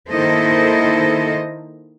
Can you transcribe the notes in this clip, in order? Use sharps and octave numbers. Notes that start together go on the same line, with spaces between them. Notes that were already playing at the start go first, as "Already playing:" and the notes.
D#3 A#3 E4 A4 C5 D#5